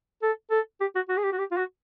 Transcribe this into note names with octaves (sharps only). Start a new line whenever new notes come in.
A4
A4
G4
F#4
F#4
G#4
G4
F#4
G4
F4
F#4